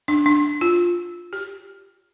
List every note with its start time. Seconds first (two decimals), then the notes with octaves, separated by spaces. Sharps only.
0.08 D4
0.26 D4
0.61 F4
1.33 G4